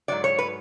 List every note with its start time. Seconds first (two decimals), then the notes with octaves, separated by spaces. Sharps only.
0.08 G#2 F#3 D5
0.24 C#5
0.38 B4